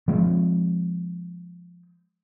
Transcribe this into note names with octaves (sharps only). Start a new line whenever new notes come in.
F3 G#3 C4